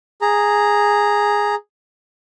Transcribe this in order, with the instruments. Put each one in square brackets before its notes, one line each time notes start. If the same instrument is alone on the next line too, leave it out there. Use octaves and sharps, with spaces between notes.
[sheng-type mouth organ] G#4 A#5